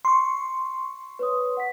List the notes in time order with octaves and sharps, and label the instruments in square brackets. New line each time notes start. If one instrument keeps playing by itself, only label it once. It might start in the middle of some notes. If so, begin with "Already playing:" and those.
[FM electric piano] C6 C#6
[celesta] B4 C#5 D#6
F#5 B6